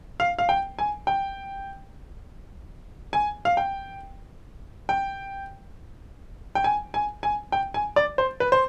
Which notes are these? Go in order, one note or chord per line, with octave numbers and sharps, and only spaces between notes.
F5
F5
G5
G#5
G5
G#5
F5
G5
G5
G5
G#5
G#5
G#5
G5
G#5
D5
C5
B4
C5